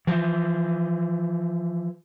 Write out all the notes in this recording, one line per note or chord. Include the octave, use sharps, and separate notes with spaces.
E3 F3